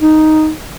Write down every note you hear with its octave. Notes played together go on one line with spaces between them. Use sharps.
D#4